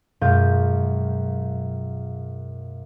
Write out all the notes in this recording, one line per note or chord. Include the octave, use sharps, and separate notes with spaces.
F#2 B2 G#3 F4 F5 G6